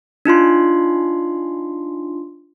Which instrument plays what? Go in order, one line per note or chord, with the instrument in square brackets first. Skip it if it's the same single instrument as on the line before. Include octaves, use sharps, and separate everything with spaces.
[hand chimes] D4 D#4 F4 C6